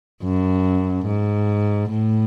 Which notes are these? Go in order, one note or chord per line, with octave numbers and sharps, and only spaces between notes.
F#2
G#2
A2